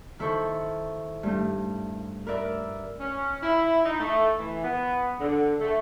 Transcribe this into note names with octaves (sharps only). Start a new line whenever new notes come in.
D#3 E4 A4 C5 C#6
G2 A3
A#4 B4 D5 E5
C#4
E4
D#4
A3
E3
B3
D3
A3